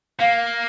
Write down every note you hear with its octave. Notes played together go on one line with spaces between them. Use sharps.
A#3 F5